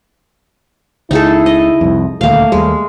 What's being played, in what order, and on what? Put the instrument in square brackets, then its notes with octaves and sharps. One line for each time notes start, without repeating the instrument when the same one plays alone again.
[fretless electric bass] C#2 [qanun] D#4 G#4 A4 [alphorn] E4
[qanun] D#5
[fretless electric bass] C2 F2
[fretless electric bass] D#1 D2 [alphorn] A3 [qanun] A#3 F5
[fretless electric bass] D#2 G3 [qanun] G#3